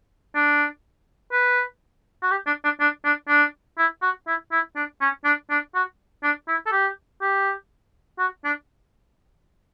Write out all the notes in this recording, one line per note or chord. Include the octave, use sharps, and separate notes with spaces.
D4
B4
F#4
G4
D4
D4
D4
D4
D4
E4
F#4
E4
E4
D4
C#4
D4
D4
F#4
D4
E4
A4
G4
G4
F#4
D4